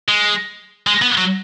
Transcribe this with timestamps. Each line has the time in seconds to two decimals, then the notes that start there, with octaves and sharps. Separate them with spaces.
0.08 G#3
0.87 G#3
1.02 B3
1.18 F#3